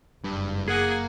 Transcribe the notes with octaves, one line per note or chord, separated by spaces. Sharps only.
F#1 G2
A#3 G#4 F#5 G#5